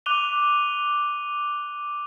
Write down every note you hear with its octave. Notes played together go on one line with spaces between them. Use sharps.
D6 F#6 D#7 F7 G7